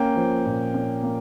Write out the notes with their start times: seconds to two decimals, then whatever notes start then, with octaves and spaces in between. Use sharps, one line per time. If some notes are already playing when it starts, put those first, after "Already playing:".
Already playing: A#3 C#4 G5
0.16 F3
0.46 A#2
0.74 C#4
1.03 A#3